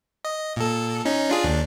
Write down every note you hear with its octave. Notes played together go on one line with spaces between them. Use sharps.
D#5
A#2 A4
C#4 D#4
D4 F4 G#4
D#2 D4